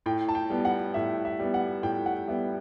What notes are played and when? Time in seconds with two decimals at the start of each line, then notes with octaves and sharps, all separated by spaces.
0.06 A2 G5
0.29 A5
0.35 G5
0.50 G3 B3
0.65 F#5
0.94 A2 E5
1.25 E5
1.40 G3 B3
1.54 F#5
1.83 A2 G5
2.06 F#5
2.28 G3 B3 E5